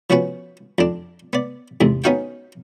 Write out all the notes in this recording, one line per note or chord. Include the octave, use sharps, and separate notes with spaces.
F3 B3 C#4 F#4 B4
F2 D4
B3 D5
E2 G#2 C3
B3 C#4 D#4 F#4 F5 G5